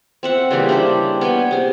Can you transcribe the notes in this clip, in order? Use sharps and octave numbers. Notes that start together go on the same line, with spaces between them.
C4 E5 F#5
C#3 E3 G3 A#3
D4 E4 G4 C5
B3 C#5 G5 G#5
C3 G#4